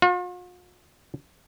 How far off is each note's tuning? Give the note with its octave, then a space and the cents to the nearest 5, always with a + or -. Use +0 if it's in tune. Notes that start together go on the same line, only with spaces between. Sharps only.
F4 +45